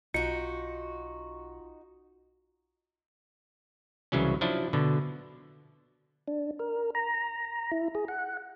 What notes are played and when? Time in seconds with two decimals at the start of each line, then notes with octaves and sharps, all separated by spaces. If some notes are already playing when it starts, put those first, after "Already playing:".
0.14 B1 D#4 F4 F#4 C#7
4.12 C2 C#3 E3 F#3 C#4
4.41 F3 F#3 D4 E4
4.73 B2 D3
6.27 D4
6.59 A#4
6.95 A#5
7.71 E4
7.95 G#4
8.08 F#5